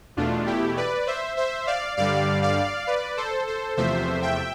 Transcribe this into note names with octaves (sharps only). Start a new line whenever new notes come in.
E2 B2 A3 D4 F4
E4 G4
B4 D5
C5 E5
C5 E5
D5 F5
G2 D3 G3 D5 F5
D5 F5
B4 D5
A4 C5
A4 C5
E2 C3 F3 A3 C5 E5
E5 G5